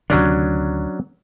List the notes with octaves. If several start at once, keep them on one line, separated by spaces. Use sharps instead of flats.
D2 C3 D#3 F#3 C#4 D4